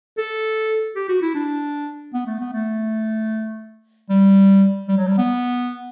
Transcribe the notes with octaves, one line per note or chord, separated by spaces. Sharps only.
A4
G4
F#4
E4
D4
B3
A3
B3
A3
G3
G3
F#3
G3
B3